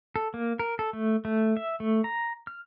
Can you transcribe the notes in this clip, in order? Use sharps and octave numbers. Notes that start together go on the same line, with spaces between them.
A4
A#3
A#4
A4
A3
A3
E5
A3
A#5
F6